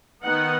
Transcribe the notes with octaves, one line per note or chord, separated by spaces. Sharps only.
D#3 B3 D#4 F#5